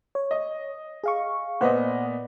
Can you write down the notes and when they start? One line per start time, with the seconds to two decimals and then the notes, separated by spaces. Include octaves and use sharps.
0.15 C#5
0.31 D#5
1.04 G#4 F5 C#6
1.61 A#2 B3 B4 C5 D#5 F#5